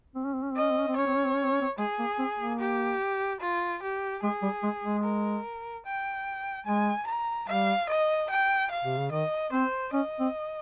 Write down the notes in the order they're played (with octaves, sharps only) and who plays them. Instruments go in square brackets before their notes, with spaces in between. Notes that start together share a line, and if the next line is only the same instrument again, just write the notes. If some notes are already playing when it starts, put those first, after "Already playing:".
[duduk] C4
C#4
C4
C#4
C4
[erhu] D#5
[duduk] C#4
C4
C#4
C4
[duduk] C#4 [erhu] C#5
[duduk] C4
C#4
C4
C#4
C4
C#4
C4
[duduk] G#3 [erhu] G#4
[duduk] A#3
C4
A#3
[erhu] G4
F4
G4
[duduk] G#3 [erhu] G#4
[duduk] G3
G#3
G#3
[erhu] A#4
G5
[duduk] G#3 [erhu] G#5
[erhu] A#5
[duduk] G3 [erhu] F5
[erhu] D#5
G5
F5
[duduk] C3
C#3
[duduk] D#3 [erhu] D#5
[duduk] C4 [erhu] C5
[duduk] C#4 [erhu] D#5
[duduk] C4